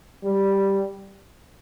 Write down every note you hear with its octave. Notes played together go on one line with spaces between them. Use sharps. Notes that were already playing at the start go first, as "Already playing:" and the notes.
G3